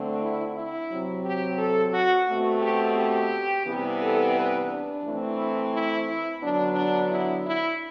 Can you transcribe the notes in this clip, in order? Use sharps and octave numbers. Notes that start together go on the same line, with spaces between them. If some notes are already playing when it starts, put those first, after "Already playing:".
Already playing: D3 A3 C4
E4
E4
C3 F#3 C4
G4
A4
F#4
B2 A3 C4 F#4
G4
G4
C3 E3 G3 B3
A4
B4
D4
E3 A3 C4
E4
E4
E4
D3 F#3 B3 D4
D4
E4
E4